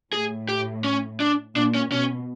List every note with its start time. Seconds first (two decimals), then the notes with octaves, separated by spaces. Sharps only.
0.12 A2 G#4
0.49 G4
0.84 C#4
1.20 D4
1.56 A#2 D4
1.74 C#4
1.92 B2 C#4